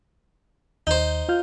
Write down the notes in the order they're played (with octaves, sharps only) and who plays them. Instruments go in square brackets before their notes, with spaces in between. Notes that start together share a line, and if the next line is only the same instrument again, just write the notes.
[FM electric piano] D#2 G6 [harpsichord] D#4 C5
[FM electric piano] F4 F6 G6